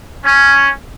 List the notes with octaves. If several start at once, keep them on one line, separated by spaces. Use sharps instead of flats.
C#4